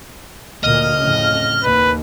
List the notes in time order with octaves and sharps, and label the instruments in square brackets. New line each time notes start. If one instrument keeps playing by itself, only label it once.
[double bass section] D2 A#2 A#3 [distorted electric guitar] D#5 [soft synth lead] F6
[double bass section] F2 A2 C#3
[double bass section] D#2 [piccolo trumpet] B4